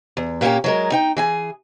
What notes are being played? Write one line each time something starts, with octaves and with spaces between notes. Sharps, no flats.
E2
A#2 A#3 B3 C#4 G4
F#3 G#3 A#4
D#4 G5
E3 G#4 G#5